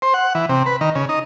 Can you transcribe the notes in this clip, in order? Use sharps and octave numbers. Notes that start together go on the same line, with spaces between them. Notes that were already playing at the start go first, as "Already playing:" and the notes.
C5
F#5
E3
C3
B4
D#3
C#3
D#4